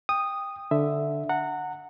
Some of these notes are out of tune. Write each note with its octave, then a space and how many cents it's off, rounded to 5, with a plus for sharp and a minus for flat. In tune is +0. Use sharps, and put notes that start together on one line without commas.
G5 +15 D#6 -10
D3 +0 E5 +0
F#5 -5 A#5 -30